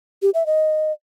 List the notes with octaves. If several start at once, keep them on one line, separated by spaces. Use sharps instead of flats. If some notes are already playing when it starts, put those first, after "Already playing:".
G4
E5
D#5